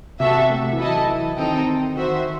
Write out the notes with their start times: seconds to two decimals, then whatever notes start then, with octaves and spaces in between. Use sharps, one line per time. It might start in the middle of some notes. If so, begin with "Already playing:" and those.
0.19 C3 F#4 A4 E5
0.49 A3
0.72 E3
0.78 F#3 E4 A4 D#5 A5
1.08 E3
1.37 D#3 C4 D#4 A4 D#5 G5
1.96 D#3 F#4 C5 E5